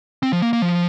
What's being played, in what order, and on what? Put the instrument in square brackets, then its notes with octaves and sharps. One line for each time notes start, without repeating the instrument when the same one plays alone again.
[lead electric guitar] C4
F3
A#3
A#3
F3